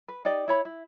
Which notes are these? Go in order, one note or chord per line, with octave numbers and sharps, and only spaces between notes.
B4
D#4 G4 D5 D#5
E4 C#5 B5
E4